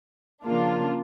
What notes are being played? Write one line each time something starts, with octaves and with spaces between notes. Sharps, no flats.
C#3 F3 A#3 D4 F4